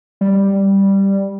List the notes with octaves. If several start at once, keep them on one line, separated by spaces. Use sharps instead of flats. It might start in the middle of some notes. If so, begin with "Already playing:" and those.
G3